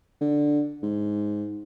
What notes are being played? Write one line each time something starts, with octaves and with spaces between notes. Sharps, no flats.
D3
G#2